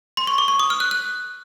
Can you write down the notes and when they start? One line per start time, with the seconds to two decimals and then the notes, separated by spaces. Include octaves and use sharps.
0.17 C6
0.27 C#6
0.38 D6
0.48 C#6
0.60 D#6
0.70 F6
0.80 F#6
0.91 F#6